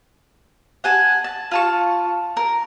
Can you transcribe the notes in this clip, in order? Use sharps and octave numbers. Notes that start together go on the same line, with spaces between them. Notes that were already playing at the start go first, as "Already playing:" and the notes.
F#5 G#5 A5
A5
F4 A5 C#6
A#4